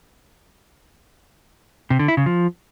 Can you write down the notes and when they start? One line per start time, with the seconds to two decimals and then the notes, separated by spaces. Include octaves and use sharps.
1.90 C3
1.99 D3
2.08 E4
2.17 C#3
2.26 F3